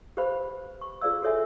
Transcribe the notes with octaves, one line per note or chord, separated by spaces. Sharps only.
G4 B4 C5 F5 B5
C#6
F4 G#4 B4 D5 F5 E6
F#4 A4 C#5 E5 G#5